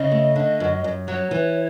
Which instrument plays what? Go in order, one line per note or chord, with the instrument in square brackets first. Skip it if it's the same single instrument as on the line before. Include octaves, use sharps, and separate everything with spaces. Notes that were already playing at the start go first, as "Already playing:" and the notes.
Already playing: [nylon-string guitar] C#3 [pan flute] D#5
[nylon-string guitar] A3
D3
F#2
F#2
[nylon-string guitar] F#3 [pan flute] C#5
[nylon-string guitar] E3